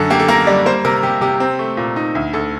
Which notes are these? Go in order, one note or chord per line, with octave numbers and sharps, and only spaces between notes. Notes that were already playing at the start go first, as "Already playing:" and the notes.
Already playing: F#2 D3 A4
A#3 G4
A4
A#3 A#4
G3 D5
A#3 C5
C3 A#4
C3 G4
C3 G4
C4
A3
A#2
D#4
D2
D2 A4